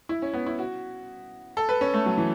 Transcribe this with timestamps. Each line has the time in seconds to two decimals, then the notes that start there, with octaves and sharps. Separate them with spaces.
0.09 E4
0.22 C#4
0.34 B3
0.46 E4
0.59 F#4
1.57 A4
1.69 B4
1.81 C#4
1.94 A3
2.06 F#3
2.18 E3